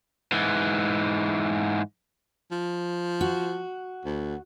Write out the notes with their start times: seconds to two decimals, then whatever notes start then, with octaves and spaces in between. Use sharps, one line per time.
0.32 G#2 E3
2.51 F3
3.21 F#4
4.05 D2